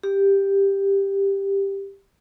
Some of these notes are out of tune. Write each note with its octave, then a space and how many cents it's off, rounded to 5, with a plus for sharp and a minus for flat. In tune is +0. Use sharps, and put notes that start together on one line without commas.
G4 +10